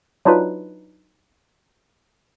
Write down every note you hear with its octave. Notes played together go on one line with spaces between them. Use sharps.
F#3 D4 D#4 F4 B4